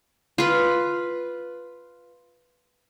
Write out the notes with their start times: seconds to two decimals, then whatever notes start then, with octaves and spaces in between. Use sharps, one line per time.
0.38 F4 B4